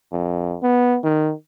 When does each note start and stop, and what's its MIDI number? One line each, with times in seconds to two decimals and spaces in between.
0.12 0.57 41
0.63 0.98 59
1.03 1.32 51